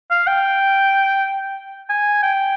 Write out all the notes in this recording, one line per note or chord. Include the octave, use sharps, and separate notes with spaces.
F5
G5
G#5
G5